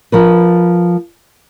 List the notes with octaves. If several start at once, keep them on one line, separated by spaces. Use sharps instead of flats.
F3 A#4 B4